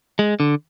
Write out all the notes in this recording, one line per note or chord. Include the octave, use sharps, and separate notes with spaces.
G#3
D3